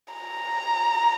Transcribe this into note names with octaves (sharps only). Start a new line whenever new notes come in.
A#5